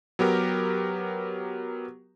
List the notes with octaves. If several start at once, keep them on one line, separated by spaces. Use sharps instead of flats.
F#3 B3 G4 A#4